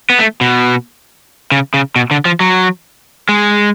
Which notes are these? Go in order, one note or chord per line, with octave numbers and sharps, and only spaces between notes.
B3
A3
B2
C#3
C#3
B2
D3
F3
F#3
G#3